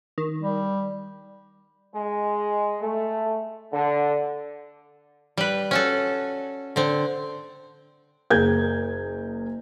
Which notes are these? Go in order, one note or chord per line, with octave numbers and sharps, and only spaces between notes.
D#3
G3
G#3
A3
D3
G3 B4
C#4 F#4 A4
D3 C4
F#1 G#4 A#4 G6 G#6